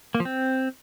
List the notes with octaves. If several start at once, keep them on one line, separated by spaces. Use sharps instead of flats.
A#3
F3
C4